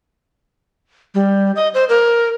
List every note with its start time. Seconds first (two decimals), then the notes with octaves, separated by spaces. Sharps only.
1.15 G3
1.56 D#5
1.74 C5
1.89 A#4